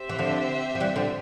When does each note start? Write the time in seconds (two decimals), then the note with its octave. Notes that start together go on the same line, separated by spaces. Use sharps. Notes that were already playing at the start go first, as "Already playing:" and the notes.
Already playing: C4 G4 C5 E5
0.09 E3
0.19 D3 F3
0.75 F3
0.80 E3 G3
0.96 D3 F3